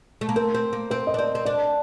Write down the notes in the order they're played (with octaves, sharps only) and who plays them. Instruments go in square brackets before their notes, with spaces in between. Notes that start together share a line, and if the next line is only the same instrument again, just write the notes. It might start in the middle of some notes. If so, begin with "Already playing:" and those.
[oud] A3
A#3
[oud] C4 [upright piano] A#4
[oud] C4
A#3
[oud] C4 [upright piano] C5
[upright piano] D#5
[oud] D4
[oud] C4 [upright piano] D5
[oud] C4
[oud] D4 [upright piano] D5